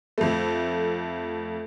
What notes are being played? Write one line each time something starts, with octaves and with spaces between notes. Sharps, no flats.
F2 A3